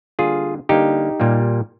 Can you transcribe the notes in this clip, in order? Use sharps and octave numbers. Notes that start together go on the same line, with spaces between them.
D3 G3 A#3 F4 G#4
D3 G3 A#3 D#4 G4
A#2 G3 A#3